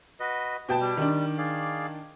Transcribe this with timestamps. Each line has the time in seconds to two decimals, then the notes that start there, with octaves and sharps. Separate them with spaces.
0.20 F#4 B4 D#5
0.69 B2 G5 A5
0.81 G3
0.97 D#3 D4
1.38 G#4 D5 F5